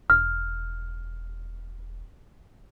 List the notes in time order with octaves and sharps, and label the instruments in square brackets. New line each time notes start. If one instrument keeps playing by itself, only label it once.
[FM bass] E1 [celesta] F6